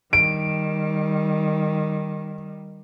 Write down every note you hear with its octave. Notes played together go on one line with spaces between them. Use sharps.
D#3 G3 D7